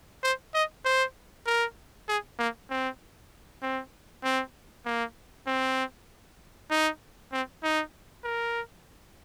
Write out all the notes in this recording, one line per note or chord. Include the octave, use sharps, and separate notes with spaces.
C5
D#5
C5
A#4
G#4
A#3
C4
C4
C4
A#3
C4
D#4
C4
D#4
A#4